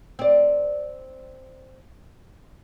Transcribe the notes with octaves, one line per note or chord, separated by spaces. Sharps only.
C4 D5